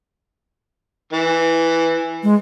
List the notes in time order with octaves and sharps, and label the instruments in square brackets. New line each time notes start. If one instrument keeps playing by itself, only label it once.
[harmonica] E3
[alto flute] G#3